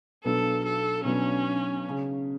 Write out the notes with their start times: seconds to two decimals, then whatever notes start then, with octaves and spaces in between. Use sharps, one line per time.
0.24 B1 B2 F#3 B3 D4 A4
0.65 A4
1.04 B1 B2 F#3 B3 C#4 D4
1.89 C#3